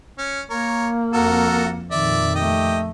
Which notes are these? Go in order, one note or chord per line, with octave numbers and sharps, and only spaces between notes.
C#4
A#3 A#4 C#5
F2 F#4 A4 A#4
F2 A#2 D#3 D5 E5
A3 G4 D#5